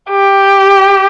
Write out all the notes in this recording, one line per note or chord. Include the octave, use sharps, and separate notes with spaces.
G4